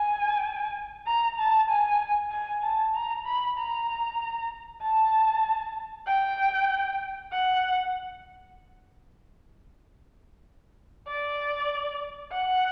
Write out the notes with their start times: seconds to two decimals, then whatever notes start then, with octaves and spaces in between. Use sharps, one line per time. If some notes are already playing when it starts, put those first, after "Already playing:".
Already playing: G#5
1.07 A#5
1.39 A5
1.69 G#5
2.32 G#5
2.63 A5
2.94 A#5
3.26 B5
3.58 A#5
4.82 A5
6.07 G5
7.32 F#5
11.08 D5
12.32 F#5